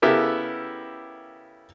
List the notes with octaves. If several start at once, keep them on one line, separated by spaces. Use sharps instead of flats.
C#3 B3 E4 G4 A4 A#4